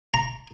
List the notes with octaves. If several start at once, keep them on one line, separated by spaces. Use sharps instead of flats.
A#5